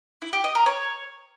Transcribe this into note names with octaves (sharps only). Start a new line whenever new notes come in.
E4
G4
D#5
A#4
C#5